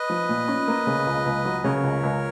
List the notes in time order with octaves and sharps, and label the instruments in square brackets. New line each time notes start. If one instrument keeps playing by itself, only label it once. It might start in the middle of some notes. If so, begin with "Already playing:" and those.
Already playing: [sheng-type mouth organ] B4 D#5
[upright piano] F3
A#2
C#4
A#3
C#3
C#2
C#2
F#3
[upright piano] C#3 [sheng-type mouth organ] A#4 C#5
[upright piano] C#2
C#2